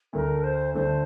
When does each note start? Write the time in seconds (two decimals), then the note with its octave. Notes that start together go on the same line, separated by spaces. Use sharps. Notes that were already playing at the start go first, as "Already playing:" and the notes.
0.13 D2 D3 A3 A#4
0.43 C5
0.74 D2 D3 A3 C5